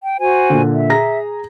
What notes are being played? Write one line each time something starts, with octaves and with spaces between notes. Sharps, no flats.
G5
F#4 C5 G#5
A#2 D3
E5
G#4 A#5 A#6